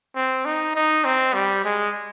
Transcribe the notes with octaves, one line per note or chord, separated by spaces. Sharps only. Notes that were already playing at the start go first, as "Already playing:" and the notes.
C4
D#4
D#4
C4
G3
G#3